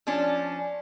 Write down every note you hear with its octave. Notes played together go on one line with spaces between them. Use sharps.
F3 C#4 D4